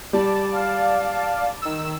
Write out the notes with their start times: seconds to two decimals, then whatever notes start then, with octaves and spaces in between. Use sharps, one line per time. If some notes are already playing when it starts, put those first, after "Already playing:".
0.13 G3 D5 A5
0.54 F5
1.62 D#3 E6